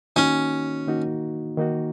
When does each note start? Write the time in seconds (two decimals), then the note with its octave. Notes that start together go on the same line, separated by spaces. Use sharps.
0.16 D#3 A#3 C#4 D#4 F#4
0.87 D#3 A#3 D#4 F#4
1.57 D#3 A#3 D#4 F#4